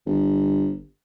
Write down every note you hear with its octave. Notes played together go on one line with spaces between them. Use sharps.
G1